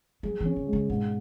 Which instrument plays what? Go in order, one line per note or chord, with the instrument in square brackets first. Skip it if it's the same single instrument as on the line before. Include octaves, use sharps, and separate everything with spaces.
[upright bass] F#3 [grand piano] G#4
[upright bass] E3 [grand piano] C#4
[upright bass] D3
[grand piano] G#3
[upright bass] C#3
[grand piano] G#2 [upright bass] B2